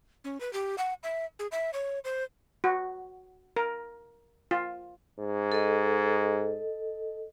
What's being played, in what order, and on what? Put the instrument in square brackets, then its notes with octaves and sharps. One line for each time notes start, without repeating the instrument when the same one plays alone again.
[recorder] C#4
B4
G4
F#5
E5
G#4
E5
C#5
C5
[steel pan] F#4
A#4
F4
[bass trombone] G#2
[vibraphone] A4 D#5